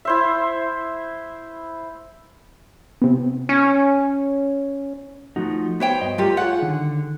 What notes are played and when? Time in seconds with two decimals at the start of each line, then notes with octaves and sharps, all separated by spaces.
0.05 E4 C5 E5
3.02 C3 B3
3.49 C#4
5.36 F3 A3 D#4 F#4
5.80 B3 C5 C#5 G5
6.01 G2 D#5
6.18 G3 A3 F4 G4 A#4
6.37 F4 G#4 C#5 F#5
6.62 D3 D#3